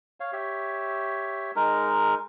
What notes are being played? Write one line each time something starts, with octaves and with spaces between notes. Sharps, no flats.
C#5 F5
G4 C#5 E5
G#3 D#4 A#4